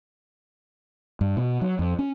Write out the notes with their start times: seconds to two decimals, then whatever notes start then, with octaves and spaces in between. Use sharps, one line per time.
1.21 G2
1.37 B2
1.61 F#3
1.79 F2
1.99 C#4